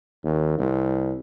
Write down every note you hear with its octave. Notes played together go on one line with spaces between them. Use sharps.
D#2
C2